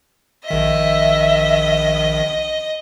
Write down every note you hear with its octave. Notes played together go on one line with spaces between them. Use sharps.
A#1 D#3 D#5 E5 B6